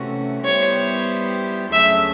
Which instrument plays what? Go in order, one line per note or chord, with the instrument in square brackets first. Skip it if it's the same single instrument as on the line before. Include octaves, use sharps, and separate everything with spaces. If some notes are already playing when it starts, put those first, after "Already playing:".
Already playing: [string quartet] C3 E3 A3 C#4 F#4
[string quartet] G3 B3 E4 G4 C5 [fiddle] C#5
[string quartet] D2 C#3 F#3 A3 [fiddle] E5